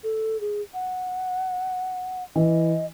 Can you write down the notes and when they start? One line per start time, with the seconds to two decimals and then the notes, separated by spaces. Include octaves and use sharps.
0.04 A4
0.41 G#4
0.74 F#5
2.36 E3 D#5